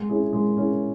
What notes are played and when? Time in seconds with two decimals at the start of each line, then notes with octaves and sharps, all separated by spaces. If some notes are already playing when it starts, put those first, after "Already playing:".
Already playing: G#3
0.09 C#4 E4 G#4
0.33 G#3
0.57 C#4 E4 G#4